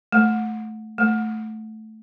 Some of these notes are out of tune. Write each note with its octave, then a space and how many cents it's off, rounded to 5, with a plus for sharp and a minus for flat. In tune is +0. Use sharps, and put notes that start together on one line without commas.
A3 -10
A3 -5